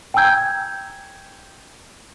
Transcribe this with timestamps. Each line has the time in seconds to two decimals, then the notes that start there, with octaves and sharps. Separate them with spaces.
0.14 G5 G#5 A#5 E6 G6 G#6